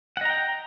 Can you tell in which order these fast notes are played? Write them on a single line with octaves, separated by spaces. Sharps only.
F#5 D#5 A#5 G5